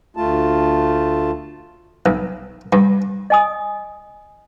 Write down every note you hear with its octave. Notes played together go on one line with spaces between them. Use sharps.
D2 A3 F4 A5
B1
G2
D#5 G#5 D#6